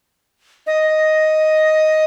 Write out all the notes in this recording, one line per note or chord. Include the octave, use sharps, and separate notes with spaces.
D#5